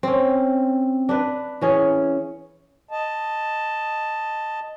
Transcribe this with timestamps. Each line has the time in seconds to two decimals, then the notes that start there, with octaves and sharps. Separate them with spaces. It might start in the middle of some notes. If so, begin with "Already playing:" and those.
0.03 C4 C#4
1.09 D4 B4
1.61 E3 C#4 G#4
2.91 D#5 A5